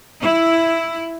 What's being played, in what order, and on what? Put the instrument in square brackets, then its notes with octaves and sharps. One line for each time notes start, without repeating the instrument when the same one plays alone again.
[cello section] E4